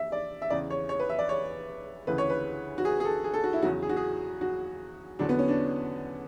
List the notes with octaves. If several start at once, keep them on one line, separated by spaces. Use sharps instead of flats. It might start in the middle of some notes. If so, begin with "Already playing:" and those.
Already playing: E5
D5
E5
E2 C#3 E3 D5
C#5
C#5
B4
E5
D5
C#5
D2 C#3 E3 B4
C#5
B4
F#4
G#4
G#4
A4
G#4
A4
F#4
E4
E2 C#3 F#3 F#4
G#4
F#4
G#4
F#4
E2 D3 F#3 D4
B3
C#4
D4